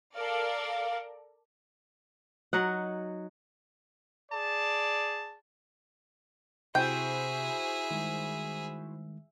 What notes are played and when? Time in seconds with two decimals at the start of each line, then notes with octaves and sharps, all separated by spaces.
0.14 A4 A#4 D5 F5
2.53 F#3 D#4 F#5
4.31 G#4 D5 A5
6.75 C3 E4 F#4 G#4 C5 E5 G5
7.91 D#3 G3 G#3